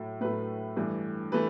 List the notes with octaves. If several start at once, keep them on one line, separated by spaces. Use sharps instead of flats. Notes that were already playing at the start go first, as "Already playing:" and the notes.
Already playing: A2 F#3 A3
A2 F#3 A3 B4
G2 E3 A3
E3 A3 B4